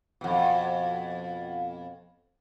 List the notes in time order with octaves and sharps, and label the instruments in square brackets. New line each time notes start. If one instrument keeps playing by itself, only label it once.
[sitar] F2 B2